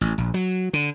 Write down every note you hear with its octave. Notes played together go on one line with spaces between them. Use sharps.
A1
A#1
F#3
D3